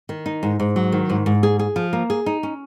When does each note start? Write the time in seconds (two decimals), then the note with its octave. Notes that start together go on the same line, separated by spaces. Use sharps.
0.09 D#3
0.26 D#4
0.43 G#2
0.60 G#2
0.76 F#3
0.92 D#3
1.10 G#2
1.26 G#2
1.43 G#4
1.59 G#4
1.76 F3
1.93 A#3
2.10 G#4
2.26 D#4
2.43 C#4